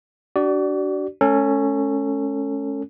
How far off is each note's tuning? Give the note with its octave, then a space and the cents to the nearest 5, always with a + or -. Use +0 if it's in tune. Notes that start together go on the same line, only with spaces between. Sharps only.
D4 -10 F#4 +40 D5 +0
A3 -40 C#4 +0 A4 +30